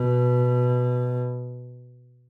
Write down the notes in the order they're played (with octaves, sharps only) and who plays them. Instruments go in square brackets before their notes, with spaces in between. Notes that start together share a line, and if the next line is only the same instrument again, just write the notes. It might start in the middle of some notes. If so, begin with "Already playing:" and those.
Already playing: [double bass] B2